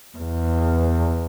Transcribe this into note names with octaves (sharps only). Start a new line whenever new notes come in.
E2